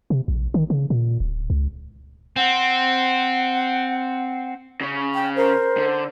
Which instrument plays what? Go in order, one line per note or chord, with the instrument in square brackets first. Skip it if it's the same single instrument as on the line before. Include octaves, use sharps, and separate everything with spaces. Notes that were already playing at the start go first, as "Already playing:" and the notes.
[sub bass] C3
A#1
D#3
C#3
A#2
D1
C#2
[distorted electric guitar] C4 [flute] F#5
[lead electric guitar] C#3 C#4
[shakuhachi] G5
[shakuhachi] A#4 [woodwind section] C5
[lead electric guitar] D3